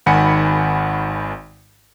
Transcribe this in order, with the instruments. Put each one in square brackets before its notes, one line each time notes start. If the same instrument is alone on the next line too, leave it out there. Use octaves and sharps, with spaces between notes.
[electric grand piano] G#1 D#3 F#5 G#5 B5 C#7